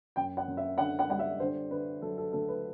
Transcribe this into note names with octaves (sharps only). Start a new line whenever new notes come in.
F#2 G5
F#5
F#2
E5
D3 F#5
F#5
G3 F#5
E5
D3 C5
D3 B4
F#3 A4
A4
D2 A4
B4